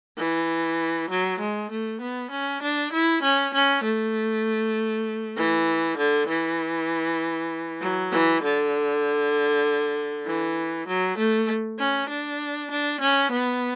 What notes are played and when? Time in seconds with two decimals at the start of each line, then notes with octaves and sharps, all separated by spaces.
0.17 E3
1.09 F#3
1.39 G#3
1.70 A3
2.01 B3
2.31 C#4
2.62 D4
2.92 E4
3.23 C#4
3.54 C#4
3.84 A3
5.37 E3
5.98 D3
6.29 E3
7.81 F#3
8.12 E3
8.43 D3
10.26 E3
10.87 F#3
11.18 A3
11.79 C#4
12.09 D4
12.71 D4
13.01 C#4
13.32 B3